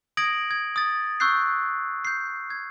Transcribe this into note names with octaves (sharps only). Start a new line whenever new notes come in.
D#6 G#6 A#6 D7 F#7
G#6
D#6 A6
C#6 E6 F#6 G6 C7
G6 C7
G#6